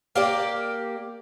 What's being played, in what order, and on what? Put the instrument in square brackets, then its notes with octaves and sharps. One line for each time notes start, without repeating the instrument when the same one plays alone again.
[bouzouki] A#3 G4 D5